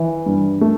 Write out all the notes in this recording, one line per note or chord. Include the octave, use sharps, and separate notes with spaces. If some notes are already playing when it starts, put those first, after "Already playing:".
Already playing: E3
G2
A3